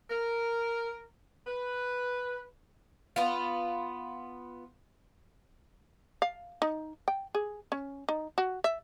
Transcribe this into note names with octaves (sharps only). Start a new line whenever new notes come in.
A#4
B4
B3 F4
F5
D#4
G5
G#4
C#4
D#4
F#4
E5